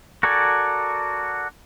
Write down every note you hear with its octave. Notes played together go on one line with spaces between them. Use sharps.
F#4 A4 A#4 D5 G#5